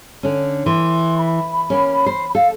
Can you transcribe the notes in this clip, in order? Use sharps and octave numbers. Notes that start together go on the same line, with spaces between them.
D3 C#4
E3 C6
B5
A#3 C#4
C5 B5
A4 F5